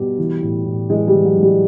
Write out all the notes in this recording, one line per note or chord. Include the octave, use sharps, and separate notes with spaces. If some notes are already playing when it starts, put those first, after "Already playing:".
Already playing: B2 G3
E3
A2
A2
E3 G#3
G3
E3
F#3
A2
G3